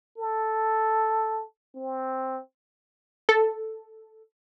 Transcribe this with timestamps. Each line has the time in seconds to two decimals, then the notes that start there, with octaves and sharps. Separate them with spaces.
0.18 A4
1.76 C4
3.29 A4